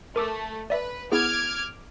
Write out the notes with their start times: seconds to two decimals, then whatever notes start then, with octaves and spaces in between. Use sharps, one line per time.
0.16 A3 A#4 D6 E6
0.70 B4 D5 E5
1.12 B3 E4 G#4 D6 F6 G#6